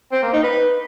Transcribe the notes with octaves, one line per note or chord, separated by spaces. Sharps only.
C4
A#3
D#4
B4